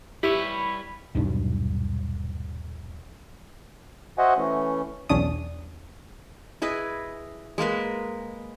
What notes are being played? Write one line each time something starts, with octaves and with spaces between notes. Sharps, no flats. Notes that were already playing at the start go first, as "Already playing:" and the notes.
G3 E4 G4 B4 C#5 B5
D#1 B1 G2 D4
F#4 C5 D#5 E5 F#5 G#5
E3 A3 C#4
B1 E2 C#4 D4 D#6
E4 G#4 B4 D#5
G#3 A#3 A#4 B4